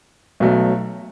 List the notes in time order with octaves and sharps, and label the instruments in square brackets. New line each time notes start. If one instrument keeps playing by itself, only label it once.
[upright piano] B1 B2 F#3 A3